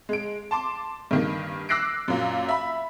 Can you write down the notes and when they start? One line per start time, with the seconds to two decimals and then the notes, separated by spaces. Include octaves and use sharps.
0.09 G#3 D7
0.51 A5 C6 D6
1.11 G2 D#3 A#3
1.69 D6 E6 F#6 A#6 C7 D7
2.08 F#2 A#2
2.49 E5 B5